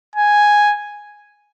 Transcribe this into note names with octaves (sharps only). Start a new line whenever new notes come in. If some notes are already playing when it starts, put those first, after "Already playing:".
G#5